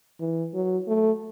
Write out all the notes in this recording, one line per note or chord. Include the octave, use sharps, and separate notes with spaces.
E3
F#3
A3